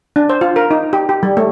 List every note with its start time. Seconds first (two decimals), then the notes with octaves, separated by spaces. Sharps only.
0.16 D4
0.30 C5
0.41 F4
0.56 A#4
0.71 D#4
0.93 G4
1.09 G4
1.23 G3
1.37 A3